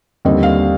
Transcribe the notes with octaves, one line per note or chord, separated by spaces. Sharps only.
D#2 D3 G3 C4 D#5
F5